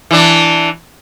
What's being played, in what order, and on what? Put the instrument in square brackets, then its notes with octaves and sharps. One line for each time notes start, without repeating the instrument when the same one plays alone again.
[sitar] E3 D4